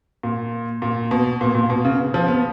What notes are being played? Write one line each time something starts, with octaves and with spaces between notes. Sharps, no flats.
A#2
A#2
B2
A#2
A#2
B2
C#3
F3
B3